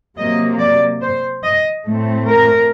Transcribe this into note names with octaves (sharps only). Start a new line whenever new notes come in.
C3 F#3 A#3 D#5
D5
C5
D#5
A2 A3 C4
A#4